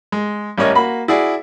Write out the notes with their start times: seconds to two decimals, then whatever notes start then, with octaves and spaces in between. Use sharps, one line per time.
0.12 G#3
0.58 A1 G3 C#4 A#4 C#5 D#5
0.75 A#3 F#4 B5
1.08 E4 F#4 G#4 D5